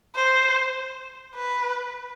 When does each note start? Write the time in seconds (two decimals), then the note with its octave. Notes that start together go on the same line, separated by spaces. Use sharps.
0.15 C5
1.35 B4